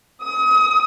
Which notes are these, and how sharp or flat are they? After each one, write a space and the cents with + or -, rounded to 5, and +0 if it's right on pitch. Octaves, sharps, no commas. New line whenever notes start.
D#6 +35